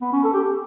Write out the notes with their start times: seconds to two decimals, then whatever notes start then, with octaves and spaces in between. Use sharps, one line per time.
0.02 B3
0.13 C#4
0.24 A4
0.34 G4